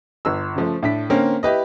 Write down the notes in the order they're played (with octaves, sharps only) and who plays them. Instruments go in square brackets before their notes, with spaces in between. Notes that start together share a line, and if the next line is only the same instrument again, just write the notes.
[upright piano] G1 E6
C#3 F3 A3
A2 D4 B6
D3 A#3 C4 C#4
E4 G4 B4 D#5